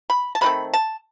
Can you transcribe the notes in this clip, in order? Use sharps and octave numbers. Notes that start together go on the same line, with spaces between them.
B5
A5
C3 D#3 A3 C4 B5
A5